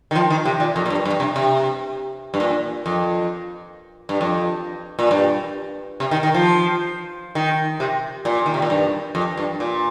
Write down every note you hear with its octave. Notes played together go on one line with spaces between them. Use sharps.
D#3
F3
D#3
C3
A#2
F2
A#2
G2
G2
C3
C3
G2
A#2
F2
G2
F2
A#2
G2
C3
D#3
D#3
F3
D#3
C3
A#2
D#3
C3
A#2
G2
F2
G2
A#2